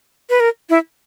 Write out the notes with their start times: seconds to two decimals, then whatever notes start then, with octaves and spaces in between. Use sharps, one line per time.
0.30 B4
0.40 A#4
0.70 E4